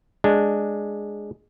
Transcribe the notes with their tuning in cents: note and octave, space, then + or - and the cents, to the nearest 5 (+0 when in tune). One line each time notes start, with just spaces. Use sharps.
G#3 +0 D4 +0